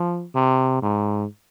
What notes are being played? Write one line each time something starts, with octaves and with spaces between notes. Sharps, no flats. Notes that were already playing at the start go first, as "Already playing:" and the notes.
Already playing: F3
C3
G#2